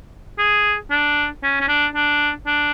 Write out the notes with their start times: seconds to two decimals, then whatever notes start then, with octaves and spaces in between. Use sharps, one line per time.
0.39 G#4
0.90 D4
1.43 C#4
1.61 C#4
1.68 D4
1.95 D4
2.47 D4